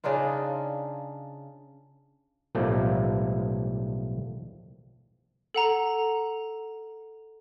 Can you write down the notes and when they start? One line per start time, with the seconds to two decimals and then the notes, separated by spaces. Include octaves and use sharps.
0.04 C#3 D4 D#4 F4
2.55 B1 A2 F3 G3 A3 A#3
5.54 A4 F#5 A#5